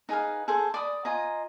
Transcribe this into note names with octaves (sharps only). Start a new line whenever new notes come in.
D#4 G#4 B4 F5
G#4 A4 C5
D5 B5 D#6
F4 D#5 G#5 A#5